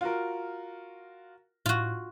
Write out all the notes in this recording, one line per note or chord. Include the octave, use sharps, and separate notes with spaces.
F4 F#4 A#4
A2 F4 F#4